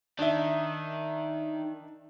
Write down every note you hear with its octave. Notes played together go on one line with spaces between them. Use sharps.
D#3 D4 E5